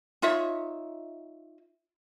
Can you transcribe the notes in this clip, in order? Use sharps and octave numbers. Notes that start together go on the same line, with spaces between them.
D#4 F4 C#5 E5